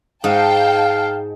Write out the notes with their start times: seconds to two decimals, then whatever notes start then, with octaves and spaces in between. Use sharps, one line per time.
0.24 G#2 D#4 F5 G5 A5